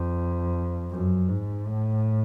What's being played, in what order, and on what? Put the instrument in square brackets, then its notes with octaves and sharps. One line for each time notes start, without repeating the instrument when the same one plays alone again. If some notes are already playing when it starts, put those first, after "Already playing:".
Already playing: [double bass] F2
F#2
G#2
A2